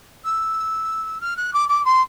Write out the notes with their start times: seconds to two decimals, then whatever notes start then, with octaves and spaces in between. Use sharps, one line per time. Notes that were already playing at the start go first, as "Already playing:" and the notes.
0.25 E6
1.21 F6
1.37 F#6
1.54 D6
1.69 D6
1.85 C6